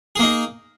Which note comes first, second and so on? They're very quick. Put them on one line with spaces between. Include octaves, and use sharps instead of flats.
G#4 A#3 D#4